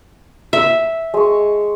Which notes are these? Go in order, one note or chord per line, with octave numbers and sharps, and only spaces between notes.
E5
G#3 C#6